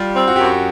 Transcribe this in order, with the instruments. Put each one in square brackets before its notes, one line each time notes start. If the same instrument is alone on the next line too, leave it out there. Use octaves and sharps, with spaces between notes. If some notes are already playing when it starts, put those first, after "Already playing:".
Already playing: [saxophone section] G3 [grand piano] F4
[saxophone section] C4
[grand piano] F#4
G4
[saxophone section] F#2 [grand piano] F#4